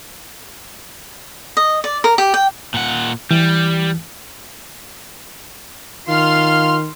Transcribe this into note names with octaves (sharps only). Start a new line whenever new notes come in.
D#5
D5
A#4
G4
G5
A#2 F#5
E3 G3
D#3 F4 C6 F6